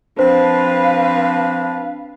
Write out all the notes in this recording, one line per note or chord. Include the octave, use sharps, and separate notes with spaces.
F3 C4 D4 B4 C5 F5